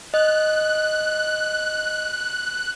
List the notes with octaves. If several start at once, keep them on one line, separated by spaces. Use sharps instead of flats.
D#5 F#6